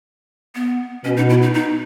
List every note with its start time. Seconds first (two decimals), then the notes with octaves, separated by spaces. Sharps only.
0.55 B3
1.04 B2 C#4
1.17 D#4
1.30 E4
1.42 D#4
1.54 D#4